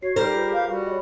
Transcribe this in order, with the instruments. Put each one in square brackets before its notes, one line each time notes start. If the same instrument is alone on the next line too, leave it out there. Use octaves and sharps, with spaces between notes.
[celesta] F#4 C7 [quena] C#5
[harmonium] G3 [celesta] D#4 [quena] G4 [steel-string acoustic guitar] A#4 C5
[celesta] F4 G#4 B4
[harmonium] F5
[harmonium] G3 [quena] F#4
[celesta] C#5 D#5